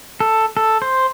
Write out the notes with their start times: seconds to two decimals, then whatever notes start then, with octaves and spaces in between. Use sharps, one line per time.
0.20 A4
0.57 A4
0.82 C5